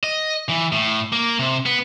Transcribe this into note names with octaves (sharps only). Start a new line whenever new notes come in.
D#5
E3
A2
A#3
C3
B3